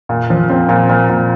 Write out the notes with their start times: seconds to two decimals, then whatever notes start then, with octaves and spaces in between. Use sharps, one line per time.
0.09 A#2
0.30 F3
0.50 C4
0.69 A#2
0.89 A#2
1.09 A#2